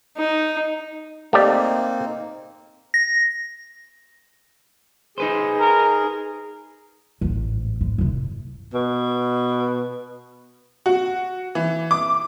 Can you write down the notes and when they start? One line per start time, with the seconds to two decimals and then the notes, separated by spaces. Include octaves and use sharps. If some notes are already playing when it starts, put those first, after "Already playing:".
0.17 D#4
1.33 A3 A#3 C4 D#4 G4 D5
2.94 A#6
5.18 D#4 G#4 B4 C5
5.59 A#4
7.21 A1 G#2
7.81 G#2
7.98 F#2 C3
8.74 B2
10.86 F#4
11.55 E3
11.91 D6